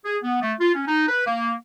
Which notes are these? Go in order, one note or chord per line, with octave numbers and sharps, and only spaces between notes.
G#4
B3
A3
F4
C#4
D#4
B4
A#3